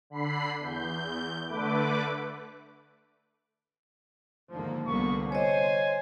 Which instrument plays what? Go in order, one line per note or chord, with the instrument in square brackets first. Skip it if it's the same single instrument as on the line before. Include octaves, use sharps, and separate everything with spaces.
[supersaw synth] D3 B5 C7
E2 G6
D3 A3 B4 D6
[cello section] D#2 A#3 [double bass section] G#2 D3 F3
[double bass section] C2 D3 [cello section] A#3 B3 [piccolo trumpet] C#6
[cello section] C5 [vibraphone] C#5 D#5 [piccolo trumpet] G#5